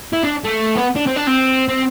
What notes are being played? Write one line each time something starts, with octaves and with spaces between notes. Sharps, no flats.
E4
D4
A3
B3
D4
C4
D4
C4
C4